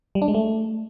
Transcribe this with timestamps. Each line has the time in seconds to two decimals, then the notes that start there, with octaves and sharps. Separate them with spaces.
0.15 G3
0.22 D4
0.28 G#3
0.34 A3